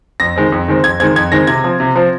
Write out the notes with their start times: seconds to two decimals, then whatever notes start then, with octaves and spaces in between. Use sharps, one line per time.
0.20 F2 A#6
0.36 D#3 G#3 C4
0.52 F2
0.68 D#3 G#3 C4
0.84 F2 G#6
1.00 D#3 G#3 C4 G#6
1.16 F2 G#6
1.32 D#3 G#3 C4 A#6
1.47 C3 G#6
1.64 F3 C4
1.80 C3
1.96 F3 C4